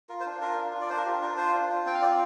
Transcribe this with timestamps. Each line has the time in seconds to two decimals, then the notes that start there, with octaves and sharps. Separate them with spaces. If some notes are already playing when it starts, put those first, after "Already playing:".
0.09 F4 A#4
0.20 C5
0.26 D4
0.42 F4 A#4
0.58 D4
0.74 F4
0.81 D5
0.90 D4 C5
0.97 A#4
1.05 F4 G4
1.22 D4 A#4
1.37 F4 C5
1.54 D4
1.70 F4
1.86 C4 G5
1.94 F5
2.02 F4 D5